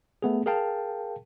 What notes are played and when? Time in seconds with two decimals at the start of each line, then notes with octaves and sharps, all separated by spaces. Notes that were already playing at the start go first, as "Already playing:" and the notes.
0.22 A3 B3 G#4
0.46 G#4 A#4 F5 G5 A5